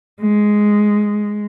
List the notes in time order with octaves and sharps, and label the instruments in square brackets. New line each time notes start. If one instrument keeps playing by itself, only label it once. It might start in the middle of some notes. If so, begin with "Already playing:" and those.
[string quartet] G#3